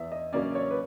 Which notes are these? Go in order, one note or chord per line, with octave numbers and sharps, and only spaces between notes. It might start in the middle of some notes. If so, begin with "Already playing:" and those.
Already playing: E2 E5
D#5
C#3 F#3 A#3 C#4 D5
C#5
B4